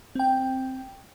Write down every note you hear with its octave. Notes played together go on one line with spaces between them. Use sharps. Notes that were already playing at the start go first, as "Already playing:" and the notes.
C4 G5